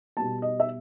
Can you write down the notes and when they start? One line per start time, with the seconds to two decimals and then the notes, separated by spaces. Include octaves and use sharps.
0.17 B2 G3 B3 A5
0.42 D#5
0.60 E5